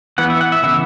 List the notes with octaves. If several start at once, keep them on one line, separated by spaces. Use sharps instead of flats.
E3 B3 F#5
E5
F#5
E5
C#3 E3 B3 E5